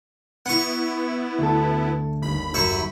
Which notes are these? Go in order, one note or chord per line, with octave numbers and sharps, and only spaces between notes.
B3 E4 F#5 C#6
D2 A4
G1 D#2 B5
F#2 E5 C#6